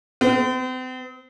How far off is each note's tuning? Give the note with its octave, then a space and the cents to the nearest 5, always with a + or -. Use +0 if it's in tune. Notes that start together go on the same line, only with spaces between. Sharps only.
C4 -40